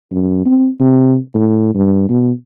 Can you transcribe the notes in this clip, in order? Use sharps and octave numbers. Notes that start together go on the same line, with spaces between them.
F#2
C4
C3
A2
G2
B2